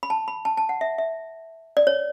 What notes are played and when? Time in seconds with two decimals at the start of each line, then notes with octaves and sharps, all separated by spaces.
0.03 B5
0.10 A5
0.28 B5
0.45 A5
0.58 A5
0.69 F#5
0.81 E5
0.98 E5
1.77 D5
1.87 C#5